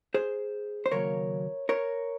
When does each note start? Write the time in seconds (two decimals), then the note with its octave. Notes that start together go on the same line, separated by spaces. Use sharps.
0.14 G#4 C5
0.86 C5
0.92 D#2 C#3 F#3 A#3 A#4 C#5
1.69 A#4 C#5